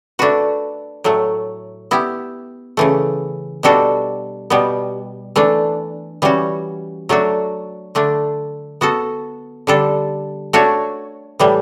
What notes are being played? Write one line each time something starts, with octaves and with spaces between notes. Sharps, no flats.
A3 D4 F#4 B4
A2 F#3 A3
B3 E4 G4
C#3 E3 A3
B2 G3 D4 F#4 A4
B2 G3 B3
E3 A3 D4
E3 G3 C#4 F#4
F#3 A3 D4 F#4
D3 A3 D4
B3 F#4 A4
D3 G3 D4 A4
A3 D4 F#4 C#5
A2 E3 G3